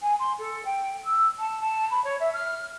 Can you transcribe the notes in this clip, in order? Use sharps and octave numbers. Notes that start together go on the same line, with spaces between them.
G#5
C6
A4
G5
E6
A5
A5
B5
C#5
E5
F6